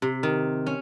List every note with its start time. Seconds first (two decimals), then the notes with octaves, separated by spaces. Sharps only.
0.02 C3
0.23 D#3
0.67 C#4